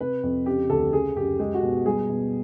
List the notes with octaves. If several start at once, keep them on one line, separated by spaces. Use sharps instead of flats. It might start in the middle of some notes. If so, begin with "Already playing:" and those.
C3 B4
F2
C#3 G4
D2 A4
C#3 G#4
F#2 G4
G#3 G4
F#4
B2
G3 G#4
B2